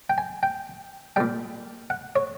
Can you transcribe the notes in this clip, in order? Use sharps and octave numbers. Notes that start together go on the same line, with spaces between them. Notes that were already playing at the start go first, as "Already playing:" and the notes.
G5
G#5
G5
A#2 G3 G5
F#5
C#5